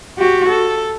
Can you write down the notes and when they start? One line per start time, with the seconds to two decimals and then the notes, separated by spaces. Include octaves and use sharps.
0.19 F#4 G4
0.49 A4